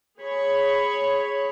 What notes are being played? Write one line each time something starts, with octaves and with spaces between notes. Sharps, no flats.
G#4 C#5 B5